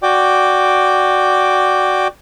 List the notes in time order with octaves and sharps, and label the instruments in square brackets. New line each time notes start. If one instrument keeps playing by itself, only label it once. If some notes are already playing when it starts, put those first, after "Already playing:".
[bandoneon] F#4 D5 G5 D6